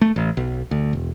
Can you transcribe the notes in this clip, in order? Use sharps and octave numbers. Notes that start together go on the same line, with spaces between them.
A3
A1
B1
D2
E1